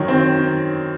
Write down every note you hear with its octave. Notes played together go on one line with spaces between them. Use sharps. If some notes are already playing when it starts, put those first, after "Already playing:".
Already playing: F#2 D#3 C#4 D#4
C4
D#3